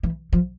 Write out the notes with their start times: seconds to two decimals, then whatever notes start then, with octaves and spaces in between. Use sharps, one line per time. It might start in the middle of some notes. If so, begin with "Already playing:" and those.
0.03 E3
0.33 F3